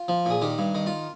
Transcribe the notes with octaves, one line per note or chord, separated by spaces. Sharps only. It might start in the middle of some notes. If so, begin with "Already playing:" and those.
Already playing: F4
F3
A#2 G#4
D#3 G4
G2
D#3
F4